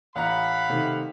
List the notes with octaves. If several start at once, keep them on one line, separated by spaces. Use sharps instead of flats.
A1 F5 F#5 A#5 B5
C3 D#3 A3